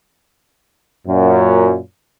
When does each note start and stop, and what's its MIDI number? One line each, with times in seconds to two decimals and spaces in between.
1.07 1.78 42
1.07 1.78 46